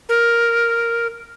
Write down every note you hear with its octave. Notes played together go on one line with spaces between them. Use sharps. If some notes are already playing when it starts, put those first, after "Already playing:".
A#4